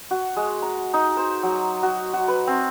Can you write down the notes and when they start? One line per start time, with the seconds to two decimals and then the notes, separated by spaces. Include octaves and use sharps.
0.11 F#4
0.37 G#3
0.62 A#5
0.94 D#4
1.17 C5
1.43 F#3
1.83 F#4
2.13 F#4
2.28 B4
2.47 C4